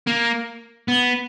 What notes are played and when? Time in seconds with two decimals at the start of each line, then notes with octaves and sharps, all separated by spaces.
0.07 A#3
0.88 B3